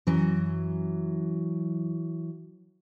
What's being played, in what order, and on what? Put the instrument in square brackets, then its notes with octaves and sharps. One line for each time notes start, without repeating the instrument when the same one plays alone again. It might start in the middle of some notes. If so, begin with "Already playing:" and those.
[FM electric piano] F#2 [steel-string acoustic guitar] E3 F#3